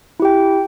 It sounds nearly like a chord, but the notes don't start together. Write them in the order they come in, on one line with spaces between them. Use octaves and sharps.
E4 G4 G5